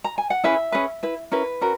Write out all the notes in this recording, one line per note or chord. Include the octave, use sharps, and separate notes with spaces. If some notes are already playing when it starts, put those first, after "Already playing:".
A#5
G#5
F#5
C#4 E4 G#4 B4 E5
C#4 G#4 B4
E4 B4
C#4 E4 A#4 B4
C#4 F#4 A#4